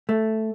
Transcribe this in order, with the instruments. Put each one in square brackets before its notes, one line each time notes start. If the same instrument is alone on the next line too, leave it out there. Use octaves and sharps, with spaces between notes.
[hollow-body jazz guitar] A3